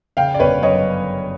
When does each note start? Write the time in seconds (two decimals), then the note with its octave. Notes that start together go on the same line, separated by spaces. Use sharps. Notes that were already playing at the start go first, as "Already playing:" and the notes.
0.17 C#3 F5 G5
0.35 D5
0.39 G1 B4 C#5
0.62 F#2 C#5 D#5